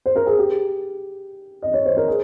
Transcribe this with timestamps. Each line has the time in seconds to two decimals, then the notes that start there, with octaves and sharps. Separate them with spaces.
0.06 C5
0.16 A#4
0.27 G#4
0.39 G4
1.62 D#5
1.74 C#5
1.86 C5
1.97 A#4
2.08 G#4